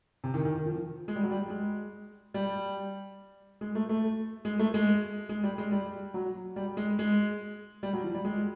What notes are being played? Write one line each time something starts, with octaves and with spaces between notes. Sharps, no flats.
C3
D#3
D#3
D#3
F3
G#3
G3
F#3
G3
G#3
G3
G#3
A3
A3
G#3
A3
G#3
G#3
G3
G#3
G3
F#3
G3
G#3
G#3
G3
F#3
F3
G3
G#3